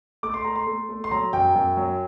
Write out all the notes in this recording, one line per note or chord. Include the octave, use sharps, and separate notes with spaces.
A3 D6
C6
A3 A#5
C6
A3
A3
C6
F#3 A#5
F#2 G5
F#2
F#3